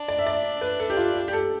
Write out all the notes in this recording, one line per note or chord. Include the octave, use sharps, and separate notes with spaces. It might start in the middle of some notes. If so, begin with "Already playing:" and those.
Already playing: D4
D5
E5
D5
B4
A4
G4
F4
G4
G4
A4